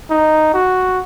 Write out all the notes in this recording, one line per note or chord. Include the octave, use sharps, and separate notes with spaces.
D#4
F#4